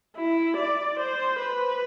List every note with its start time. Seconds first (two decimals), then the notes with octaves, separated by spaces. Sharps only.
0.16 E4
0.57 D5
0.99 C5
1.40 B4